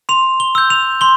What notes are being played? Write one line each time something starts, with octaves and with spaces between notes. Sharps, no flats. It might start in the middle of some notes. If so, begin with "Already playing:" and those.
C6 F7
G7
E6 G6
F7
C6 G7